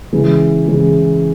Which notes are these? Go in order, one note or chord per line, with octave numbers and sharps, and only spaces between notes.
C#3 E3 G#3 E4 G#4
C#3 E3 G#3 E4 G#4